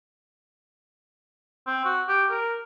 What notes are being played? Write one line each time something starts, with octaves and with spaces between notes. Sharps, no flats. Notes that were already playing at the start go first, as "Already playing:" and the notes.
C4
F#4
G4
A#4